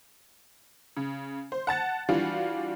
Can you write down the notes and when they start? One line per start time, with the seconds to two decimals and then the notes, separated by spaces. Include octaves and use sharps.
0.97 C#3
1.52 C5
1.67 F#5 A5 A6
2.09 E3 G3 D4 F4 F#4